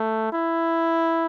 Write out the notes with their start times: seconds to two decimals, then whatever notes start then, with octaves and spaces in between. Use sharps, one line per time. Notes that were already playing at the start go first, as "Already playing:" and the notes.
Already playing: A3
0.32 E4